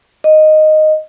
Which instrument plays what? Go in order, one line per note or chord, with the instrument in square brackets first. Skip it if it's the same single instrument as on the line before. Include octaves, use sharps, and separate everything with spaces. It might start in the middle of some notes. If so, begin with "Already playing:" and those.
[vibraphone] D#5